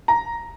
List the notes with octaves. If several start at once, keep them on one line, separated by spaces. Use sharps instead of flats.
A#5